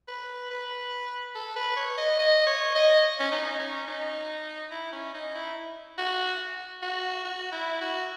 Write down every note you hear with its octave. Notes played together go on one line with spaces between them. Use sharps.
B4
B4
A4
B4
C#5
D#5
D#5
C#5
D#5
C#4
D#4
C#4
D#4
E4
C#4
D#4
E4
F#4
F#4
F#4
E4
F#4